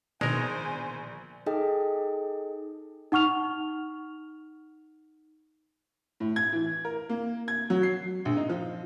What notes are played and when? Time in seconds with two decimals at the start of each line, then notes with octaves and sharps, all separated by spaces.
0.21 A#1 B2 D3 D#3 G#3 A#4 C5 G#5
1.46 D#4 G#4 A4 D#5 G5
3.12 D#4 F#5 C#6 F6 F7
6.20 A2
6.36 G#6
6.53 E3
6.85 A#4
7.09 A#3
7.48 G#6
7.70 F#3
7.83 C7
8.25 A#1
8.37 D#4
8.49 F3